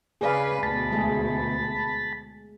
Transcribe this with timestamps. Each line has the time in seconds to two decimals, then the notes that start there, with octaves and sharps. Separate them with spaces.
0.21 C#3 G#4 B4 D5 F5
0.63 D2 B2 A5 B5
0.92 G#3 A3 G#4